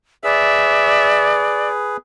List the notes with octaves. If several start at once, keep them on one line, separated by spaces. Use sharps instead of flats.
G#4 B4 D5 E5